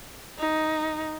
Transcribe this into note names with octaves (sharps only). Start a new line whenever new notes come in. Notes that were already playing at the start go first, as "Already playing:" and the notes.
D#4